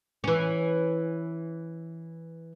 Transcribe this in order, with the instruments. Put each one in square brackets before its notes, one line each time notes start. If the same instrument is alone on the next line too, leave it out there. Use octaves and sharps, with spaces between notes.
[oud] E3 C#4